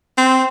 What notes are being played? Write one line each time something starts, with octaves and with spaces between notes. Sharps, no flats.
C4